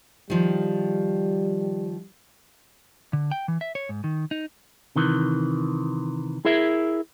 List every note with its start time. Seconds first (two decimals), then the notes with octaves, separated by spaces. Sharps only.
0.30 D#3 F3 G3
3.13 D3
3.31 G5
3.48 E3
3.61 E5
3.75 C#5
3.89 G#2
4.04 D#3
4.31 D#4
4.96 C3 D#3 E3
6.45 E4 G#4 A#4 E5